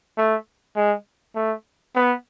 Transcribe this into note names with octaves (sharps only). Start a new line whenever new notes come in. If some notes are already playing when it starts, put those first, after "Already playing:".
A3
G#3
A3
B3